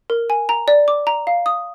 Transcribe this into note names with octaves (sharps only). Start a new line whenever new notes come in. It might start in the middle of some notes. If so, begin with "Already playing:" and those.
A#4
G#5
A#5
D5
D6
A#5
F5
D#6